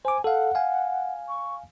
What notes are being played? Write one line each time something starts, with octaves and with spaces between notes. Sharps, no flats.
C5 G#5 D6
A4 F5 F#5
F5 G#5
C#6